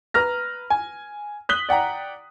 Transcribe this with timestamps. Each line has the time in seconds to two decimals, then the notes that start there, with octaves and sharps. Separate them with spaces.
0.14 B4 A#5 F6 A#6
0.70 G#5
1.49 D#6 F#6 B6 F#7 G7
1.69 D5 F#5 G5 A#5